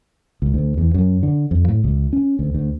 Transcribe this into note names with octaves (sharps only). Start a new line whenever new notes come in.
C#2
D2
E2
F#2
D3
F2
A2
C#2
C#4
D2
D2